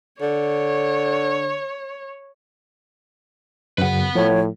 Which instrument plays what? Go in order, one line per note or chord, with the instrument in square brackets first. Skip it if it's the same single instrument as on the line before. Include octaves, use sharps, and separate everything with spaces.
[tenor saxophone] D3 [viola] C#5
[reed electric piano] F#2 C#3 [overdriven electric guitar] B4 F#5
[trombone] A2 [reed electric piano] F3 [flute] C#5